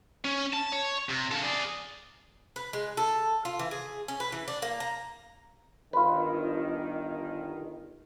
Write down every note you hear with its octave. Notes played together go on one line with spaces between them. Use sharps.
C#4
A5
C#5
C3
C#3 A4
G#4 D5
B4
G#3
A4
F4
E3
G#4
C#4
B4
E3
D4
A#3
A#5
G1 D#3 F4 B4